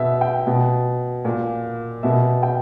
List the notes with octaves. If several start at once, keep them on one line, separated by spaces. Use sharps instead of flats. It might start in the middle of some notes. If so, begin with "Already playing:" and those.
Already playing: B2 E5
G5
B2
A#2
B2 E5
G5